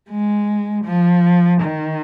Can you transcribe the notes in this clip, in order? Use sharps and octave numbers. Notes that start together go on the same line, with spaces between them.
G#3
F3
D#3